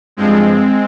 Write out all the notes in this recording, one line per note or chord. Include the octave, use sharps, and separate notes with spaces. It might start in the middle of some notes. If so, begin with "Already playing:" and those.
G2 F3 G#3 C4